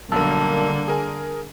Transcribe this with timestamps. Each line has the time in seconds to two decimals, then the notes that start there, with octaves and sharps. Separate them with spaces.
0.12 B1 D3 G3 A#3 A#4 A5 E6
0.88 G#4 A#4 G#5